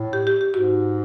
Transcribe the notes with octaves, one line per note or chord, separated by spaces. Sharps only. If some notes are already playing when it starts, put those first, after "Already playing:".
Already playing: A2
G4
G4
G4
G#2 F#4